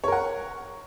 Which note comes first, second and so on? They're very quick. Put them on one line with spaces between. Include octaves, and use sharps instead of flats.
C#5 A#4 F#5